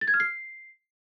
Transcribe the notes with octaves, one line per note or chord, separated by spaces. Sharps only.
A6
G#6
F6
C7